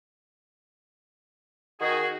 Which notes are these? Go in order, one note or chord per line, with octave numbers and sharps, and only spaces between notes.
D#3 F#4 G#4